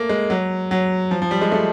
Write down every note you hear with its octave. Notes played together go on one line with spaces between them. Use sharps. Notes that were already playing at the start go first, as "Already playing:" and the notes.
Already playing: A3 A#3
G#3
F#3
F#3
F3
F3
G3
G#3
A3